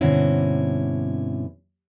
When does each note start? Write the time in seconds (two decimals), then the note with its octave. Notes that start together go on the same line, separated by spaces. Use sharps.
0.01 G2 B2 D3 C4 C#4 E4